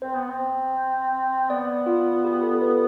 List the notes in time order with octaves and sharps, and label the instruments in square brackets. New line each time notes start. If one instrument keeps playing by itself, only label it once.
[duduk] C4 [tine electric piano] C5
[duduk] B3
C4
[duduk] B3 [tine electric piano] D5
[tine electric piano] F4
G4
A4
B4